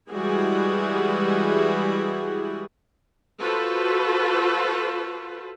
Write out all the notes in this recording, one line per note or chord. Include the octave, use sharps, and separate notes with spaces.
E3 G3 G#3 E4 F#4 G#4
F4 F#4 A4 B4 C5